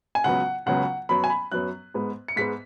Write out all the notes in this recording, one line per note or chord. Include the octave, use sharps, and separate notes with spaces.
G#5
C#2 C#3 F#3 B3 F#5
C#2 C#3 F#3 B3 F#5
F#2 F#3 B3 B5
G#5
B5
F#2 F#3 B3 F#6
G#2 G#3 B3
C#7
G#2 G#3 B3 B6